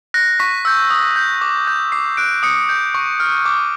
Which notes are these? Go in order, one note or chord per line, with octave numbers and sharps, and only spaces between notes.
F#6 A#6
C#6 B6
E6 G6
D#6
G6
D6
G6
D6 C7
F#6 D7
D#6 C#7
G6
C#6
F6
D6